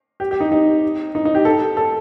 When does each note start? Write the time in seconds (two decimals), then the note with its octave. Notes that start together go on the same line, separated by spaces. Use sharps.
0.20 G4
0.31 G4
0.40 D#4
0.52 D#4
1.15 D#4
1.25 D#4
1.35 G4
1.45 A4
1.77 A4